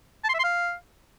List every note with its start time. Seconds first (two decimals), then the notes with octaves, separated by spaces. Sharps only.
0.24 A5
0.29 C6
0.34 E5
0.39 C6
0.44 F5